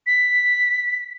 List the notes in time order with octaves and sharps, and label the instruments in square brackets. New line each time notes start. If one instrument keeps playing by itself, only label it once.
[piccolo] B6